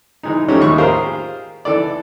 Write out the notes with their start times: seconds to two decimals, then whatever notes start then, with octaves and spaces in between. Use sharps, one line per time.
0.23 E3 G#3 D#4
0.48 F3 A3 C#4 D#4 F#4 G4
0.60 D#2 A2 G#3 C#6
0.78 F4 G4 G#4 A#4 C5 F5
1.65 E3 A4 D5